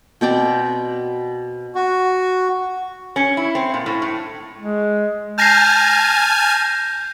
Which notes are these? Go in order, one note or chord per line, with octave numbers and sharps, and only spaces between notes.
B2 C4 D5 G5
F#4
C#4
E4
C4
A#2
A2
A2
G#3
G#5 A5 F6 G6 A#6 C7